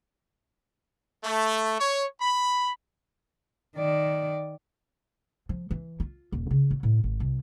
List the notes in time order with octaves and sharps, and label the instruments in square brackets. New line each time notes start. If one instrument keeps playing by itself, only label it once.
[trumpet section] A3
C#5
B5
[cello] D#3 D5
[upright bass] F3
E3
F4
D#1
C#3
F#3
A2
G#1
C2